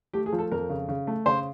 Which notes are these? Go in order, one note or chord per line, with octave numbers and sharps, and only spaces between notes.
A3 G4
G#4
F3
A4
F2 A#4
C#3
C#3
A3
C#3 C5